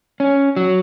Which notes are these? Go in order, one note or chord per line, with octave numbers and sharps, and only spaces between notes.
C#4
F#3